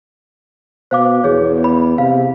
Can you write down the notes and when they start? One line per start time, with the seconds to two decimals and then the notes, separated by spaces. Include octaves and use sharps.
0.91 B2 C5 F5 D6
1.24 E2 G#4 C#5
1.64 B5
1.98 C3 F5